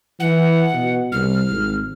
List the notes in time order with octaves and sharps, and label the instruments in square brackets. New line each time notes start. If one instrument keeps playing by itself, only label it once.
[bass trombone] E3 [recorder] F#5
[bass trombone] B2
[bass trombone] C2 [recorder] F6
[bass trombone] G#1